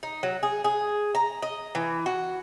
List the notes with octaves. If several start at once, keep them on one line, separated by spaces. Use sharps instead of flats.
D#4
F#3
G#4
G#4
A#5
D#5
E3
F#4